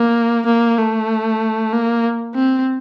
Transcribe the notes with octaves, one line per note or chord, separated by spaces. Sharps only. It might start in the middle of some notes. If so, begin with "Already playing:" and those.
Already playing: A#3
A#3
A3
A#3
C4